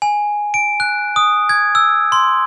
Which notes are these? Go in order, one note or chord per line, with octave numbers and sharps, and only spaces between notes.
G#5
D7
F#6
D#6
G#6
E6
C6